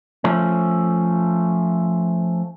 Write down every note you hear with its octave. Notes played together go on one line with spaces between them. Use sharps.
F3 A3 C#4